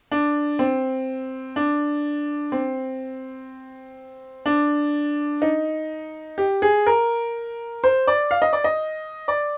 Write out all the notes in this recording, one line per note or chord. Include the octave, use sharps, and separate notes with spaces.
D4
C4
D4
C4
D4
D#4
G4
G#4
A#4
C5
D5
F5
D#5
D5
D#5
D5